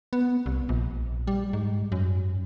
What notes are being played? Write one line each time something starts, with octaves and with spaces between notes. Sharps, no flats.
B3
C2
A#1
G3
G#2
F#2